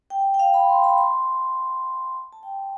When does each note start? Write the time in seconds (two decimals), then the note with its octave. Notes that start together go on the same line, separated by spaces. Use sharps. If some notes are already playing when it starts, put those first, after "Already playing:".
0.10 G5
0.34 G5
0.39 F5
0.54 B5
0.69 C6
0.84 B5
0.98 C6
2.33 A5
2.43 G5